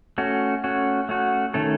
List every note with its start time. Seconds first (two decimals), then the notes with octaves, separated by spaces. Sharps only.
0.18 A3 C#4 F#4
0.64 A3 C#4 F#4
1.09 A3 C#4 F#4
1.54 D#3 A3 C#4 A4